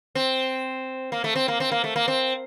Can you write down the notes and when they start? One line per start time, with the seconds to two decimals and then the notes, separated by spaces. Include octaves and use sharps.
0.15 C4
1.12 A#3
1.24 A3
1.36 C4
1.48 A#3
1.60 C4
1.72 A#3
1.84 A3
1.96 A#3
2.08 C4